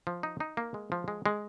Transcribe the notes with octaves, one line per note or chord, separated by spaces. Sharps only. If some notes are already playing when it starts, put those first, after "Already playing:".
F3
D#4
D#4
A#3
G#3
F3
G#3
G#3